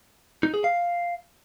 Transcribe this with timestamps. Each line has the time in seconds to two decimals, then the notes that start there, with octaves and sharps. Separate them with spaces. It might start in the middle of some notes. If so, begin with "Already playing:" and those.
0.43 D#4
0.54 G#4
0.64 F5